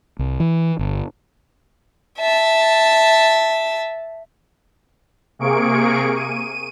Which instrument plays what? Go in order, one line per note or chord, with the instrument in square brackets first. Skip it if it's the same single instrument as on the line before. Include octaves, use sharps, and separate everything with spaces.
[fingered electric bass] C2
E3
G1
[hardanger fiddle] E5 A5
[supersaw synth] C3 A#3 G#4 C#6 D7
D#7